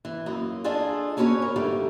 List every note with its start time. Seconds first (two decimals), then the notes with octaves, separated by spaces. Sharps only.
0.05 E3
0.26 F#2 A#3 D#4
0.64 D4 F4 G#4 A4 D#5
1.17 A#3 C#4 F#4 B4 C#5 G#5
1.42 A#4
1.56 D3 D#3 F3 G3 A3